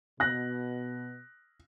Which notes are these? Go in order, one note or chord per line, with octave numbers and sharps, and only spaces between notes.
B2 F#6 A#6